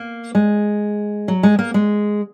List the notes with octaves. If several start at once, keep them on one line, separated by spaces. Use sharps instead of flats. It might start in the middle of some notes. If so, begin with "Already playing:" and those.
Already playing: A#3
G#3
F#3
G#3
A#3
G#3